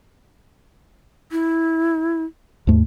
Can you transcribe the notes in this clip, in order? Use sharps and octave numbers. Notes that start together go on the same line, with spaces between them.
E4
D#2 G#2 A3